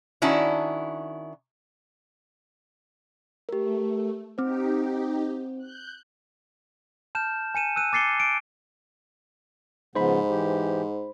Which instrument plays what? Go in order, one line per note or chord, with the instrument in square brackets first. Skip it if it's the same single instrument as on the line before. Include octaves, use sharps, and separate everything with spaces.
[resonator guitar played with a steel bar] D#3 C#4 D4 E4 F#4
[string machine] A3 [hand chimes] G4 A#4
[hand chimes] C4 C5 [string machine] D#4 G4
[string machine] F#6 G6
[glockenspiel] A5 F6 G6 E7
G#5 C#7 D#7 E7
E6 F#6 D#7
D6 A6 C7 C#7 G7
D7
[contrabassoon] G#2 [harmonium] C#3 F3 B3 [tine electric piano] C5 B5
[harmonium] E3 G4